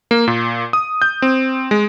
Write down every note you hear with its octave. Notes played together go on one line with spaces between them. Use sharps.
A#3
A#2
D#6
G6
C4
G#3